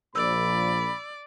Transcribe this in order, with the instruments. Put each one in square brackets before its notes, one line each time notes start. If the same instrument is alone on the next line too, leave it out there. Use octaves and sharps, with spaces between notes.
[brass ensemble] A#1 A#2 [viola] D5 [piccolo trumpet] B5 [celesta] E6